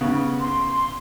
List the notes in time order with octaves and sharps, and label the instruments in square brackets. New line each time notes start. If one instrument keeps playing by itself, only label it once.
[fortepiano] C#3 B3
[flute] C6